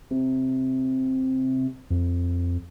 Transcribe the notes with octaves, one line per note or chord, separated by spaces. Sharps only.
C3
F2